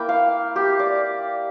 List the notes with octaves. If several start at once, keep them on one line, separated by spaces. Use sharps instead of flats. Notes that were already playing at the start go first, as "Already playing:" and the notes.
Already playing: A#3 E4 G5
F5
G4
D5